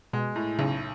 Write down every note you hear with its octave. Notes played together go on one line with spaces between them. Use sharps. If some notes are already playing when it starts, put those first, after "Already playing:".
B2 G#3
A2
B1 C#3